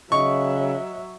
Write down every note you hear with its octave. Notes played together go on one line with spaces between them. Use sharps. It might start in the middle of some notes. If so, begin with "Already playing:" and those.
C#3 F#3 D#5 E5 C#6